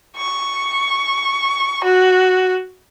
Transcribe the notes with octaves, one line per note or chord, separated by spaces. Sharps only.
C#6
F#4